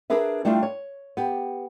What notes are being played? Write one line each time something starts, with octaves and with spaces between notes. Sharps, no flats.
D4 G#4 A#4 B4 E5
G3 A3 D4 E4 F4 G4
C#5
B3 G4